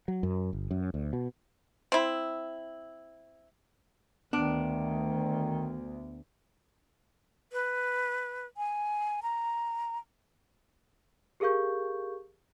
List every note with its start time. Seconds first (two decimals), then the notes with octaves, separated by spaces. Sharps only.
0.08 F#3
0.23 F#2
0.53 G1
0.71 F#2
0.94 D2
1.13 B2
1.92 C4 E4
4.33 D2 D#3 B3 D4 D7
7.52 B4
8.57 G#5
9.23 A#5
11.40 G4 G#4 A#4 F5 C#6 G6